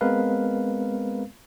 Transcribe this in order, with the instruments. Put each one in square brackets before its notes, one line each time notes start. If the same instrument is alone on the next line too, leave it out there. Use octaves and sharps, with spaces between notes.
[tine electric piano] G#3 B3 C4 A#4 B4 F5